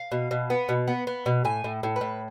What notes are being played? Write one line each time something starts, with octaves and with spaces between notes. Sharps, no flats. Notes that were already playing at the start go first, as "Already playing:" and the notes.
Already playing: F5
B2
B2
B3
B2
B3
B3
B2
A2 G#5
A2
A2
B4
A2